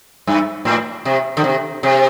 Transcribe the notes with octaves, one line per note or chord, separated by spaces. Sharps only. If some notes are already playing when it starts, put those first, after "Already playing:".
G2
A2
C3
D3
C3
C3